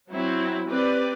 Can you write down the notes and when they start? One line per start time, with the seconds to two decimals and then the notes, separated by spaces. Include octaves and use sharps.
0.10 F#3 C4 E4
0.69 C4 G4 B4 D5